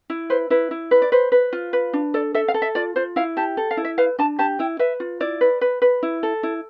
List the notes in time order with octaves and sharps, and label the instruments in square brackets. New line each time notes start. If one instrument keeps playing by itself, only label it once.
[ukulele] E4
B4 C5
E4 B4
E4
B4
D5
B4 C5
B4
F4
B4
D4
A4 D5
A4 E5
F5
A4
E5
F4 D5
F4 C5
E4 F5
G4 A5
A4
F5
E4
E5
B4 F5
D4 A5
G4 A5
E4 G5
B4 E5
F4
E4 D5
B4
B4
B4
E4
A4
E4